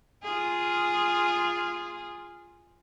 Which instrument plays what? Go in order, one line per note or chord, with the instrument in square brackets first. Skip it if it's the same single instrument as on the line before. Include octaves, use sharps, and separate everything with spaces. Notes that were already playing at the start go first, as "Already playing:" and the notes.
[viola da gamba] F4 G#4